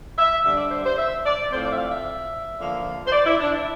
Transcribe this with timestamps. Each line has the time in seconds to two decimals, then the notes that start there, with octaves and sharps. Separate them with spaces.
0.17 E5
0.44 D3 G3 D4 E5
0.57 D5
0.71 C5
0.84 C5
0.98 E5
1.25 D5
1.51 A2 F3 A3 C4 C5
1.64 D5
1.72 E5
1.78 F5
1.91 E5
2.58 D3 F3 A#3
3.06 C5
3.12 D5
3.25 E4
3.39 D4
3.52 E4